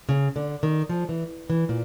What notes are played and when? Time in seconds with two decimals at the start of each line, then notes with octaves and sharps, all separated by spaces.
0.09 C#3
0.36 D3
0.63 D#3
0.89 F3
1.09 E3
1.50 E3
1.69 A#2